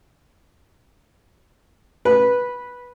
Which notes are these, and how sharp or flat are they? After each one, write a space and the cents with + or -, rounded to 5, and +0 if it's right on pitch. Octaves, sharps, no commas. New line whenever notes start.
B4 -10